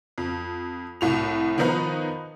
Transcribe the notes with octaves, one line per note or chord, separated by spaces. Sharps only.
F2
C2 A2 F7
D#3 F3 B3 D#4 B4